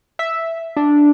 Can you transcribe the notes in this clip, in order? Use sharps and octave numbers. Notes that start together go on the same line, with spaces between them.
E5
D4